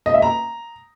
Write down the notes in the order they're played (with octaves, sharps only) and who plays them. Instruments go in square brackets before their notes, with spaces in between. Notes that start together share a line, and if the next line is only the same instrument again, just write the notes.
[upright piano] D#5
E5
A#5